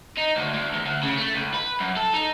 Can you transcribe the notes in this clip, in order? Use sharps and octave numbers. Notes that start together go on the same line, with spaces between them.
D#4
D2
D2
E2
D2
C#3
A3
C#2
B4
F#2
A4
D#4